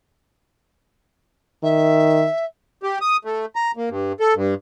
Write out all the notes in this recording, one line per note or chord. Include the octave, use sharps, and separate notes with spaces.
D#3 E5
G4
D#6
A3
A#5
A#3
G2
A4
G2